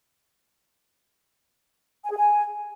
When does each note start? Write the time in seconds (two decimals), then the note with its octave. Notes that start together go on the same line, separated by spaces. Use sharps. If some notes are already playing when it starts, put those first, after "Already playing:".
2.04 G#5
2.10 G#4
2.16 G#5